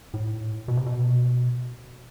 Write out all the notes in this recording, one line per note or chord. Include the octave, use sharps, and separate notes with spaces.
A2
B2
C3
B2